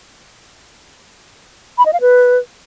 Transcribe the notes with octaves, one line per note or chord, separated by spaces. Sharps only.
B5
D#5
F5
B4